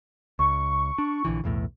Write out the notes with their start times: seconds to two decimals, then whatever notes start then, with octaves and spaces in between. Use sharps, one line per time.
0.39 C#2 C#6
0.98 D4
1.25 A#1 D3 E3
1.44 B1 E2 A2